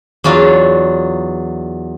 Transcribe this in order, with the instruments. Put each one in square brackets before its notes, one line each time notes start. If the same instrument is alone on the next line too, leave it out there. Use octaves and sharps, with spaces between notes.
[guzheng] E2 F#3 D4 F4 F5